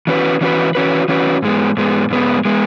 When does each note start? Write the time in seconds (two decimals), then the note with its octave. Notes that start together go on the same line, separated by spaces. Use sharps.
0.07 E3 C#4 F#4 B4
0.41 E3 C#4 F#4 B4
0.75 E3 C#4 F#4 B4
1.08 E3 C#4 F#4 B4
1.42 G#2 G#3 B3
1.77 G#2 G#3 B3
2.10 G#2 G#3 B3
2.45 G#3 B3